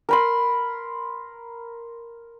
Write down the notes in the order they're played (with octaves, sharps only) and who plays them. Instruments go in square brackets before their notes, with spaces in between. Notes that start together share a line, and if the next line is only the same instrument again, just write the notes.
[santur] A#4 B5 C6